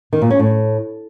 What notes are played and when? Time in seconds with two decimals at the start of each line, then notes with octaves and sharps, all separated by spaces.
0.13 D#3
0.22 A#2
0.30 C#4
0.39 A2